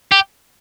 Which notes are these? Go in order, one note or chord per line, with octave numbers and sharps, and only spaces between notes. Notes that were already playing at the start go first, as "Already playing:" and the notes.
G4